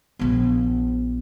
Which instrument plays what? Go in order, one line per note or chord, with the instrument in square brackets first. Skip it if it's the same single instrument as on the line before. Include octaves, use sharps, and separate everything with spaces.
[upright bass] A#1 B3